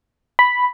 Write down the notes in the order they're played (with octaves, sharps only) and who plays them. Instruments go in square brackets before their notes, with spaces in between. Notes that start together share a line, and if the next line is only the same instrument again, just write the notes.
[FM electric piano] B5